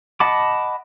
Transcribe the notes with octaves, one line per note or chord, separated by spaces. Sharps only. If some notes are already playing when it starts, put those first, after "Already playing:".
D#5 F#5 A5 B5 D6